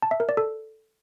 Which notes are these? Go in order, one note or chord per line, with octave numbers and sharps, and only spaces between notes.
A5
E5
A#4
D5
A4